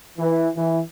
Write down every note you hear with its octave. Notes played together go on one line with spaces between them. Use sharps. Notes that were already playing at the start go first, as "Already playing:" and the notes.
E3
E3